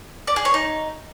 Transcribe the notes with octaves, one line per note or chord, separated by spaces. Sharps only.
D5
G#4
C#5
D#4